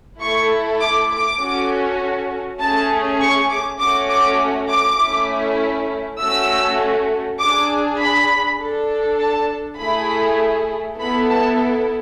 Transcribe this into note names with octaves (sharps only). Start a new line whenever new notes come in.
A3 E4 A4 C#6
D6
D6
C#4 F#4 A4
A3 C#4 G#4 A5
C#6
D6
A3 C#4 F#4 D6
D6
D6
A3 C#4 E4
A3 C#4 F#4 A4 E6
D4 G#4 D6
B5
D4 A4
A5
A3 E4 G#4 B5
B3 E4 A4 B5
A5